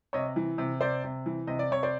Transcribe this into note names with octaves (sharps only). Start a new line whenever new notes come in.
C3 C#5 D#5
E3
C3
C3 C5 D5
C3
E3
C3 D#5
D5
C3 C#5
C5 D5